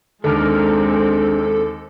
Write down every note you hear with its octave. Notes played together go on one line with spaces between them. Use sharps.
D#2 G#3 C4 D4 A4 A#4 F6